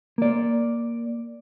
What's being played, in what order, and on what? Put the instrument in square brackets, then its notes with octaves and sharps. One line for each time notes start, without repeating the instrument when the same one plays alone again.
[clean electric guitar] A#3 D5